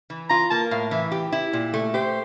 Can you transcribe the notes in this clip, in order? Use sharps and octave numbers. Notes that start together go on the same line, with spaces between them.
E3
F4 A#5
A#3 A5
A2 F5
E3 E5
G4
E4
A#2
A3
G4 C5